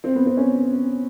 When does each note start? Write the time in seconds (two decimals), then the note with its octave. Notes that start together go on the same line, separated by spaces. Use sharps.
0.04 C4
0.15 B3
0.26 C4
0.37 C#4